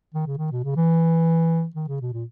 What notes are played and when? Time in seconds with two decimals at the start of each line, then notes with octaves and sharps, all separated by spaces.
0.14 D#3
0.26 C#3
0.38 D#3
0.51 B2
0.64 C#3
0.76 E3
1.75 D#3
1.88 C#3
2.01 B2
2.13 A#2